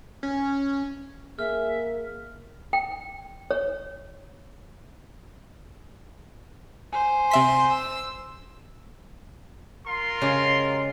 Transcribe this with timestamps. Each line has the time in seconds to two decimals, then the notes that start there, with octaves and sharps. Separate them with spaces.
0.23 C#4
1.39 A#3 G#4 E5 F6
2.73 G5
3.51 C#5
6.93 C5 G#5
7.31 C3 E5 C6 B6
7.71 E6
9.87 F4 A#4 C6
10.21 C#3 G#3 G4